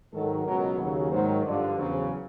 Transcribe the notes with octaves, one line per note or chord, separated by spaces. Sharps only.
G#2 D#3 F#3 A4
C#2 B2 F#3 A#4
D#2 C#3 F#3
G#2 D#3 F#3 C5
G2 D3 F3 D5
E2 C#3 F#3 C5